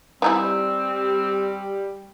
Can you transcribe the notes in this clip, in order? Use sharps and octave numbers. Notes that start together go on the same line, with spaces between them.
E3 G3 C4 D#4 E4